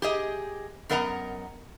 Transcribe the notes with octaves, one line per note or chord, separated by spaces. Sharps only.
G4 G#4 D#5
F#2 B3 A#4 D#5 F#5 A#5